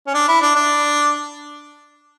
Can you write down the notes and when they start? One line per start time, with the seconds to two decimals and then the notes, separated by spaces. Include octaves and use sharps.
0.07 C#4
0.14 D4
0.28 E4
0.42 D4
0.55 D4